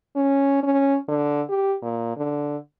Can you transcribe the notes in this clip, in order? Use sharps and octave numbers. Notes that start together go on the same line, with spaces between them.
C#4
C#4
D3
G4
A#2
D3